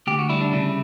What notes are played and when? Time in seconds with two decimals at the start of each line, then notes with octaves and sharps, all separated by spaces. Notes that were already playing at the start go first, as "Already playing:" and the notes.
0.07 D2 G4
0.19 F#4
0.30 G3 E4
0.41 D4
0.53 C#3 E4